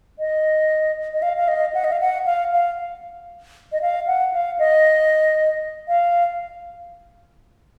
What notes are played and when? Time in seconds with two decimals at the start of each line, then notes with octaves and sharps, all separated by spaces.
0.19 D#5
1.14 D#5
1.22 F5
1.37 F5
1.48 D#5
1.74 F#5
1.84 D#5
1.92 F5
2.00 F#5
2.26 F5
2.52 F5
3.72 D#5
3.82 F5
4.07 F#5
4.33 F5
4.59 D#5
5.88 F5